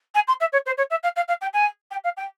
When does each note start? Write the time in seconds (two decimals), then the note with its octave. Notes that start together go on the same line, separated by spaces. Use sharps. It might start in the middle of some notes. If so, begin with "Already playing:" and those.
0.14 G#5
0.27 C6
0.40 E5
0.52 C#5
0.66 C5
0.77 C#5
0.90 E5
1.03 F5
1.16 F5
1.28 F5
1.41 G5
1.53 G#5
1.91 G5
2.04 F5
2.17 G5